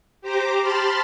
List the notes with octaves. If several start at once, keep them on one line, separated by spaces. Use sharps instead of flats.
G4 C5 A#5 D6
A5 B5 C6 F6 A6